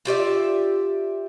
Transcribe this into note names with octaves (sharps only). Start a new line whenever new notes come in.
F4 G4 D5 E5